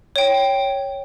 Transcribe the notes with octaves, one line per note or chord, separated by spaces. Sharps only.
C#5 G5